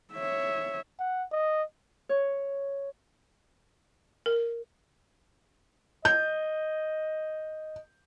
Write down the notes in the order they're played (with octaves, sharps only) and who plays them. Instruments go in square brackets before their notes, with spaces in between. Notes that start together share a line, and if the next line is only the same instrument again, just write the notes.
[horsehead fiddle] C#5 E5
[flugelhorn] F#5
D#5
[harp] C#5
[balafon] A#4
[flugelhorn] D#5 [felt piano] G6